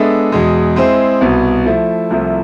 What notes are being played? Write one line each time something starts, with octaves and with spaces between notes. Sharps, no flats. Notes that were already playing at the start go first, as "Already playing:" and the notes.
Already playing: G#3 B3 D4 A4 E5
E2 B2 G#3
G#3 C4 E4 G#4 C5
C2 B2 B3
F3 A3 E4
C2 C3 F3 A3 E4